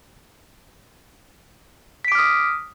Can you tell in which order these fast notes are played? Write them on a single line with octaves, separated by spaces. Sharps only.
B6 D7 D6 F6 D#6